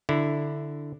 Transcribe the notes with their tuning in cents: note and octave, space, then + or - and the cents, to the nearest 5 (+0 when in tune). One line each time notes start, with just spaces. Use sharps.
D3 +0 E4 +0